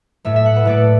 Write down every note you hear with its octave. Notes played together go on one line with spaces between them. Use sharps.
A2 A3 E5
E5
F#5
B4
A2 A3 D5